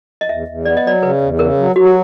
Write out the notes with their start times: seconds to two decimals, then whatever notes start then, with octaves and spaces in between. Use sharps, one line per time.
0.21 D#5
0.28 E2 E5
0.48 E2
0.65 B3 D5
0.77 D#5
0.84 F#3 D5
1.02 C#3 B4
1.22 E2
1.39 C#3 A#4
1.57 F#3
1.76 F#3 F#4
1.85 G4